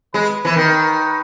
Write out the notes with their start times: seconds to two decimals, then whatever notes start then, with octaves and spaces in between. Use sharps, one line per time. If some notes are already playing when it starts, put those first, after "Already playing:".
0.14 G#3 B4
0.45 E3
0.56 D#3